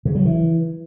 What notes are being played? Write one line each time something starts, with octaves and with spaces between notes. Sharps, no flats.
C#3
F#3
E3